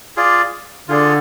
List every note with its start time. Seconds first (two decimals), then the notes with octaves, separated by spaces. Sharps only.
0.17 F4 G#4 D5
0.88 D3 F4 G#4 D5